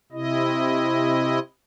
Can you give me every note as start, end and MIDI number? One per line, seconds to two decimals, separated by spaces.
0.12 1.39 48
0.12 1.39 64
0.12 1.39 75